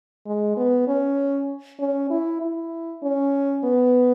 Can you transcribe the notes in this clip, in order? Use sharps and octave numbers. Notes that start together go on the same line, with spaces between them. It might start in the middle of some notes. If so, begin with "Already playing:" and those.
G#3
B3
C#4
C#4
E4
E4
C#4
B3